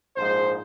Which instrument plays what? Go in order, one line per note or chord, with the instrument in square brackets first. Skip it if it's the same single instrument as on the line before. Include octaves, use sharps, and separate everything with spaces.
[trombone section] A#1 G#2 F3 G#3 C5